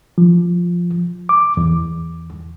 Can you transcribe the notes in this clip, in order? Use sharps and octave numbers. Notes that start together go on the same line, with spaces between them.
F3
D6
E2